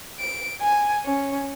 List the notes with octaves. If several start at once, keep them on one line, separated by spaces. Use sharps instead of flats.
D7
G#5
C#4